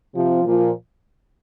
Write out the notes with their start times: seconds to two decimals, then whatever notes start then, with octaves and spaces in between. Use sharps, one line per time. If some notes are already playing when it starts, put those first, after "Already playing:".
0.15 C3 F3
0.44 A#2 F3